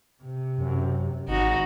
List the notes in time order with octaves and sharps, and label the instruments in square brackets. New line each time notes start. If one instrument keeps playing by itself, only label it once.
[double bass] C3
[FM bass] F#2
[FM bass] G#1 [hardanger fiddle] D#4 F#4